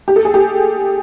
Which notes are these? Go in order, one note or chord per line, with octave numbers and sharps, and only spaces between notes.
G4
A4
G#4
G4